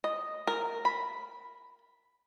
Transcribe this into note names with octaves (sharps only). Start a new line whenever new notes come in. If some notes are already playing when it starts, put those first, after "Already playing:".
D#5
A#4
B5